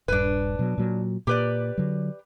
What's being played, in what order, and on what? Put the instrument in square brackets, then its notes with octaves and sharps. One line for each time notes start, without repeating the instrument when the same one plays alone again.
[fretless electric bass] D#1 G2 [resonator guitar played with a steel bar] D4 B4
[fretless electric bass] B2 F#3
A#2 F#3
[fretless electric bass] A#2 [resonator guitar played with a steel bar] G4 B4 D5
[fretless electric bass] D3 F#3